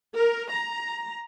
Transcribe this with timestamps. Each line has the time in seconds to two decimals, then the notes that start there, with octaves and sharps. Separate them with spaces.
0.13 A#4
0.50 A#5